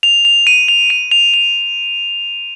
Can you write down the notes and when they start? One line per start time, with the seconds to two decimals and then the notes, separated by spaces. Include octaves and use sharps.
0.03 F7
0.25 F7
0.47 D#7
0.68 F7
0.90 D#7
1.11 F7
1.34 F7